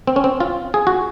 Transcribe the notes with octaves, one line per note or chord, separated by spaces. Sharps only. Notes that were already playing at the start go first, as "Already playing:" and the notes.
C4
C#4
C4
F4
G#4
F#4